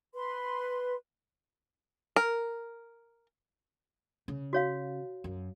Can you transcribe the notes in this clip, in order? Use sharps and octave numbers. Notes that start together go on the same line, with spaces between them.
B4 C6
A#4
C#3
F#4 C#5 F5
F#2